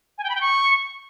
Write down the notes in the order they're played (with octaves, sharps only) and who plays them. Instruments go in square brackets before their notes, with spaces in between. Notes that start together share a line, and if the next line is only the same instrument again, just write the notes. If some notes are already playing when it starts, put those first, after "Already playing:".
[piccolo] G#5
G5
B5
G5
C#6